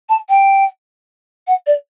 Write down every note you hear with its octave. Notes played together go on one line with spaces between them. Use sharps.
A5
G5
F#5
D5